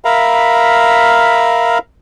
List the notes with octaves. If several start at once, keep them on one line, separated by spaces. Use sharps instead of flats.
A#4 E5 F5 A#5 B5